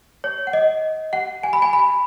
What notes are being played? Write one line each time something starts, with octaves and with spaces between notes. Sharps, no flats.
C#5
F#5
D#5
F#5
G#5
B5
G#5
B5